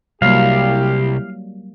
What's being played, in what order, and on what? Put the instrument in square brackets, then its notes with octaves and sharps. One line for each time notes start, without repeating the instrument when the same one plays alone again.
[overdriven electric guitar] C2 [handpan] F#3 G3 A#3 [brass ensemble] E4 G4 [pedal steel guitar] F5